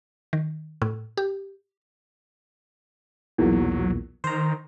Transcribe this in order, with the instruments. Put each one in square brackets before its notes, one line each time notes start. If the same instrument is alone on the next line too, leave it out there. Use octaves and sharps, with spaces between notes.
[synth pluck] D#3
A2
G4
[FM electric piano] B1 E2 A#2 [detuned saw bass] F#3
[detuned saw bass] D#3 [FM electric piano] C5 A#5